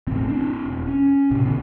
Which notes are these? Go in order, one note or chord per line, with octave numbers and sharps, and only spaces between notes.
E1 A1 D2 C4
C4 D4
E1
C#4
B1 A2 C3
D3 B3